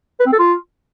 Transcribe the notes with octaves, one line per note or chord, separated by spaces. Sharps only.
B4
C4
A4
F4